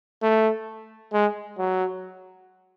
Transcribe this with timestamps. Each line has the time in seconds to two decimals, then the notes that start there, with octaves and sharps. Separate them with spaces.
0.22 A3
1.13 G#3
1.58 F#3